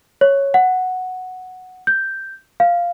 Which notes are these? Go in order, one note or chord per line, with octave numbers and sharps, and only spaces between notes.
C#5
F#5
G6
F5